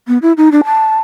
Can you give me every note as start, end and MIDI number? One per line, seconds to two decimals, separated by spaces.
0.08 0.18 59
0.22 0.32 64
0.37 0.49 63
0.52 0.61 62
0.65 0.98 81